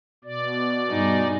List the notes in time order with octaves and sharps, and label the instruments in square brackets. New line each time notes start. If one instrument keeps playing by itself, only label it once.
[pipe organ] B2 D5
[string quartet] G2 G#3 D#4